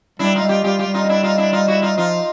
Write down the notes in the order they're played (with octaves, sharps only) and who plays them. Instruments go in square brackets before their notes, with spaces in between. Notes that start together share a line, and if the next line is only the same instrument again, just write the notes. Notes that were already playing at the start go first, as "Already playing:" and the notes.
[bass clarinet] G3 [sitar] D4 E4
[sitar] D#4 F4
[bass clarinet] G3
[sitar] F4 G4
[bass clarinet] G3 [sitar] F4 G4
[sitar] F4 G4
[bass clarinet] G3
[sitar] D#4 F4
D#4
D4 E4
D#4 F4
D4 E4
D#4 F4
E4 F#4
D#4 F4
[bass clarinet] F3 [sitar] D#4 F4